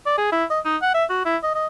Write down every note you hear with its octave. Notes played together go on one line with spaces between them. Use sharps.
D5
G#4
E4
D#5
D#4
F#5
E5
F#4
E4
D#5
D#5